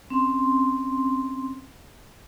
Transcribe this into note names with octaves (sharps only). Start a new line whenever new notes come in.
C4 C#4 C6